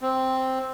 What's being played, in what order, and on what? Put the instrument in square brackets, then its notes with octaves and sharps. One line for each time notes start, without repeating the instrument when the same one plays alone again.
[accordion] C4